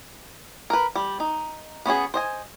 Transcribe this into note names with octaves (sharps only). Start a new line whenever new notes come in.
A#4 B4
G3
D#4
B3 C#4 F#4 G#4
C5 D#5 G#5